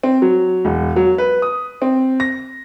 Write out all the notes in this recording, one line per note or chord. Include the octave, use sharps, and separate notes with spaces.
C4
F#3
E1
F#3
B4
D#6
C4
A#6